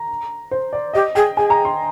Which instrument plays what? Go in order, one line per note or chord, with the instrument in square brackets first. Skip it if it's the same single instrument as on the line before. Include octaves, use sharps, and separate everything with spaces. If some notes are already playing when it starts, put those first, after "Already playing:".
Already playing: [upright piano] A#5
C5
D5
[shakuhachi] G4 [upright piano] D#5
[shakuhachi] G#4 [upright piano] G5
[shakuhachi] G#4 [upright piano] G#5
[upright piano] A#5
C6